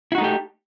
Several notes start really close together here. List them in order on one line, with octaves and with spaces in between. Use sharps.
E4 F#4 D#4 A3 G4